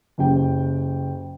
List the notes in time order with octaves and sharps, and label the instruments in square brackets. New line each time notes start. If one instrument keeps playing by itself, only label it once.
[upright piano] F#1 C#3 C#4 G4 G5